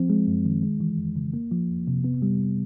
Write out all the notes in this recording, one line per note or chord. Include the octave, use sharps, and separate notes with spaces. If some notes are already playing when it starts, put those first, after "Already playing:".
Already playing: F3 C4
G#3
F#2
D#3
G#3
E3
F2
C#3
A#3
F3
F2
C3
B3
G3